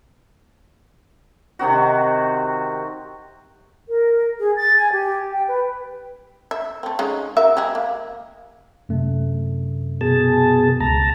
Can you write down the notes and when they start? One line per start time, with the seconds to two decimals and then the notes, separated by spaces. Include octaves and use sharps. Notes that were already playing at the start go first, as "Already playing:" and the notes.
1.59 C3 D#3 C4 F#4
3.89 A#4
4.40 G#4
4.57 A6
4.77 G#5
4.92 G4
5.32 G5
5.48 B4
6.51 E5
6.83 A3 C4
6.99 G#3 C#4 D#4
7.37 F#4 A#4 E5
7.57 G#3 G4 G#4
7.75 A#3
8.89 F#2 C3 A3
10.01 B2 G#4 A5
10.80 C#2 A5 A#5